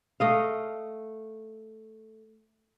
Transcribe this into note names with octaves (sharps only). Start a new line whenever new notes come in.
A3 D#5 F5